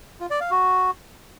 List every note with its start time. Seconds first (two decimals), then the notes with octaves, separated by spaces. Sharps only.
0.20 F4
0.30 D5
0.41 F5
0.51 F#4